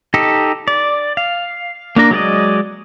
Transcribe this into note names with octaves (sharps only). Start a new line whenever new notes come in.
D#4 G4 A4
D5
F5
A#3 D4 A#4
F#3 G#3 D5 D#5